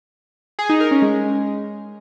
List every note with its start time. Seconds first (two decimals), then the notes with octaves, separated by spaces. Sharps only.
0.59 G#4
0.69 D#4
0.80 A#4
0.91 C#4
1.02 G#3